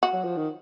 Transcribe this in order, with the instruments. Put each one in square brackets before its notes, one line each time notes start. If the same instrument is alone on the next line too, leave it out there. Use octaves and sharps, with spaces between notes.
[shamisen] F#4
[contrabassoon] F#3
F3
D#3